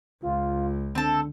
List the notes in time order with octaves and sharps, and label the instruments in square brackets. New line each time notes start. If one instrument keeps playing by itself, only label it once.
[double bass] C#2 [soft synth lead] F4
[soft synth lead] D3 [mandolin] C4 A4